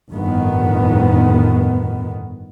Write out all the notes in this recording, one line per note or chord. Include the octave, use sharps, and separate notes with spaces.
G1 F2 A2 D#3 B3